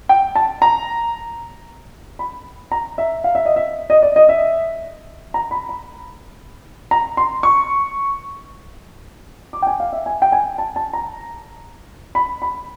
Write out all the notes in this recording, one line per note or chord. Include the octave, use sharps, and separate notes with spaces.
G5
A5
A#5
B5
A#5
E5
F5
E5
D#5
E5
D#5
D5
D#5
E5
A#5
B5
B5
A#5
C6
C#6
D6
G5
G#5
F5
E5
G#5
G5
G#5
A5
A5
A#5
B5
B5